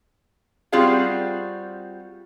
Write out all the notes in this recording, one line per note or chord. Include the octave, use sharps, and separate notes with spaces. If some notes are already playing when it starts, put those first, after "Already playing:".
G3 C4 F4 F#4 G#4 F5